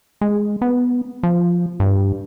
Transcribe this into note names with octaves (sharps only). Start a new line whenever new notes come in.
G#3
B3
F3
G2